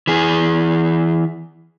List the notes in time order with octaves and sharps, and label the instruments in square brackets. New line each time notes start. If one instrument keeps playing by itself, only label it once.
[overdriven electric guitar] E3 G#4